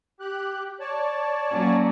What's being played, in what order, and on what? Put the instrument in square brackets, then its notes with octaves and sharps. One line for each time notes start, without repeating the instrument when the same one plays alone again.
[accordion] G4 F#6
C#5 D5 A5
[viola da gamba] F#3 A#3 C#4